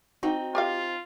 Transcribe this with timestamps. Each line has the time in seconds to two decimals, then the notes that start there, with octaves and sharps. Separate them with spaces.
0.23 C4 D#4 F#4
0.55 F4 G4 D#5 F5